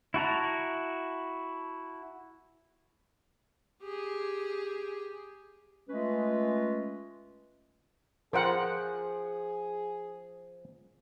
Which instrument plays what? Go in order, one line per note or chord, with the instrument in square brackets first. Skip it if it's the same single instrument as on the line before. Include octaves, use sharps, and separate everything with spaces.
[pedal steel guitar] E4 F#4 A5 A#5
[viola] G4 G#4
[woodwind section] G#3 A3 C#4 F4 B4 D#5
[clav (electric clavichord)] F3 G5 [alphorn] G#4 [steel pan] A#4 C5 F#5